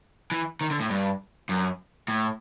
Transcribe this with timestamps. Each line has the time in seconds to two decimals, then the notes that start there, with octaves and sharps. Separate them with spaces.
0.32 E3
0.61 D#3
0.71 D3
0.80 A2
0.90 G2
1.49 F#2
2.08 A2